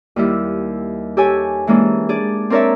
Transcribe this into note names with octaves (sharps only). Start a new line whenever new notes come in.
D#2 G3 E4
G4 A4 C#5 G#5
E3 G#3 A#3 C#4 D4
D4 G#4 D5
C4 D4 A#4 C#5 D5 E5